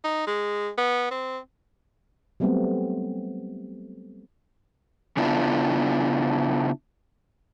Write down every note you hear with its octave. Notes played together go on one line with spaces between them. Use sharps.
D#4
G#3
B3
C4
F#3 G3 A3 B3 C4
C#3 B3 D4 E4 F4